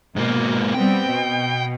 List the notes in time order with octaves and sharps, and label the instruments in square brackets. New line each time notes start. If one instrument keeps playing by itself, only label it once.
[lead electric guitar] G#2 A#3 [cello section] B2
[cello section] G3 B3 C4 [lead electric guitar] G5
[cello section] B2